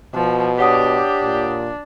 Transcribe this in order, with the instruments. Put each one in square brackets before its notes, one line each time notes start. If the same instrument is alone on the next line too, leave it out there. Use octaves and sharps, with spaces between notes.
[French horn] B2 [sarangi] F3
[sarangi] D4 [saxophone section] G4 [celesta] C#5 F#5 D#6
[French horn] A#2